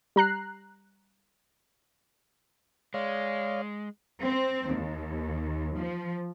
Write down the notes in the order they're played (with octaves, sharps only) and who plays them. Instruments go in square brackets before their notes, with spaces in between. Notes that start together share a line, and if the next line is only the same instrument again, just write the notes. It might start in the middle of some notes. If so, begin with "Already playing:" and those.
[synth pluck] G3 A#5 F#6 C7
[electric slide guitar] G#3 [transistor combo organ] C#5 D5 F5
[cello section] C4
D#2
F3